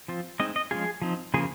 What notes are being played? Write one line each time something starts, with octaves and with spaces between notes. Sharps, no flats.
F3 C4 F4
G#3 C4 D#4 D#5
D#5
F3 G#3 C#4 F4 G#4
F3 C4 D#4
C#3 F3 A#3 G#4